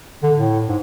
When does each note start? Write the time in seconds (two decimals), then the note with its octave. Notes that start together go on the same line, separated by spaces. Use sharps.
0.23 D3
0.35 A2
0.69 G#2